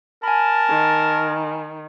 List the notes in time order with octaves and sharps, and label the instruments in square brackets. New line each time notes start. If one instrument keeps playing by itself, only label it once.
[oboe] A#4 [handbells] G#5 B5 [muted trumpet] A5
[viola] D#3